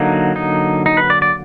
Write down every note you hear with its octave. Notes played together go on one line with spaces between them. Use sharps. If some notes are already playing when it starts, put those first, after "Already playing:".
Already playing: D3 F#3 A#3 D#4
D#4
D#4
B4
D5
D5